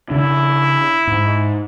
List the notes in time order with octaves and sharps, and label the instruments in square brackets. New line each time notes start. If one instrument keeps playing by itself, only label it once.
[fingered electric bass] C#3 D4 [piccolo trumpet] E4
[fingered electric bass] G#2